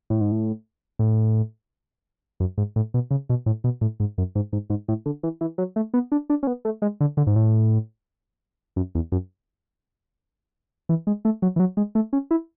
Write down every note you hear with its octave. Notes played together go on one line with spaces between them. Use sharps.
A2
G#2
A2
A2
F#2
G#2
A2
B2
C#3
B2
A2
B2
A2
G#2
F#2
G#2
G#2
G#2
A2
D3
E3
E3
F#3
A3
B3
D4
D4
C#4
B3
A3
G#3
D3
D3
G#2
A2
F#2
E2
F#2
E3
G#3
A3
F#3
E3
F#3
G#3
A3
C#4
E4